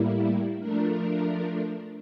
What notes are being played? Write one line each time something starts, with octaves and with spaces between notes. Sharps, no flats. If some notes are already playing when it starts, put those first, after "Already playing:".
Already playing: A2 G3 A#3 E4
F3 A3 D4 A#4